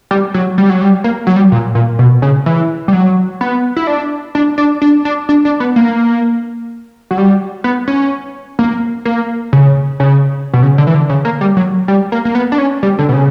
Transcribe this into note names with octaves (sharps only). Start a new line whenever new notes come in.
G3
F#3
G3
F#3
G3
A#3
F#3
G3
A#2
A#2
B2
C#3
E3
G3
F#3
B3
E4
D4
D4
D4
D4
D4
D4
D4
B3
A#3
F#3
G3
B3
C#4
A#3
A#3
C#3
C#3
B2
C#3
D3
E3
D3
C#3
A#3
G3
F#3
G3
A#3
A#3
B3
D4
C#4
G3
D3
B2
C#3